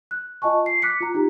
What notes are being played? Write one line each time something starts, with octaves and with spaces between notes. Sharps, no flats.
F#6
F4 D#5 G#5 A5 C#6
C7
D6 F#6 B6 C#7
F4 A#5
D#4 G4